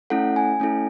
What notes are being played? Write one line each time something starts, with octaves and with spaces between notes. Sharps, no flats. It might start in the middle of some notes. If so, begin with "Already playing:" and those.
A3 C#4 E4 A4 F#5
G#5
A3 C#4 E4 A4